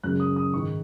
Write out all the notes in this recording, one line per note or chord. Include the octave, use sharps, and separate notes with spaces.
F#2 C#3 G#3 F#6
D#6
D#6
G#2 D#3 G#3 C#6